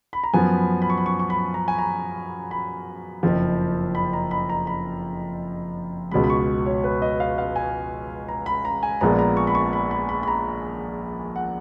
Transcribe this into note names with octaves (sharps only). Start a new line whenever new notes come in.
B5
A#5
F#2 F3 B3 G#5
B5
B5
C#6
B5
C#6
C#6
B5
A#5
G#5
A#5
B5
F#1 F2 F3
B5
A#5
B5
A#5
B5
C#2 B2 G#3 B5
B5
C#6
C#5
B4
D#5
F5
F5
G#5
A#5
B5
A#5
G#5
A#1 A#2 G#3 B3 A#5
A#5
C#6
B5
C#6
B5
B5
B5
B5
A#5
F#5